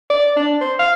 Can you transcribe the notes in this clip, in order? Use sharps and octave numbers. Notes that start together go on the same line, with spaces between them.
D5
D4
C5
F5